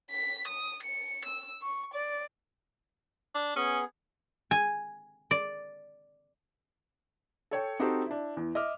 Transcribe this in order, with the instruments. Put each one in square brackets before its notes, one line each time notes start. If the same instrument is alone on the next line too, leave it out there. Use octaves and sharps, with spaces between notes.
[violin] B6
D#6
C#7
E6
C#6
D5
[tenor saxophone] D4
[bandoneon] B3 G#4 [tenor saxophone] C#4
[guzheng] G#5
D5
[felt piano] A4 C#5 G5
C4 D#4 F#4 G4 A4 C5
D4 E4
E2
D#5 E5 D6 F6